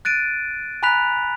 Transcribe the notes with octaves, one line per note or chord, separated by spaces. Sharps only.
F#6 A6 D7 D#7
G#5 A#5 B5 F#6 B6 F7